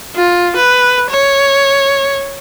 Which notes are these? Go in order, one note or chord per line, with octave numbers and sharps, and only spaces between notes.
F4
B4
C#5